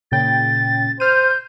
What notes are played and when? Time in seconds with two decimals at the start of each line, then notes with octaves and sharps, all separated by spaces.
0.12 A#2 C#3 G5 A6
1.00 C5 F6 G6 D#7